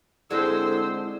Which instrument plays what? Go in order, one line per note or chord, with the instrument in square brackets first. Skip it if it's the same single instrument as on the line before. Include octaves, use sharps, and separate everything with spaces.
[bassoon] D3 [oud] G#3 C4 A4 [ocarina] E4 [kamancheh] C5 E6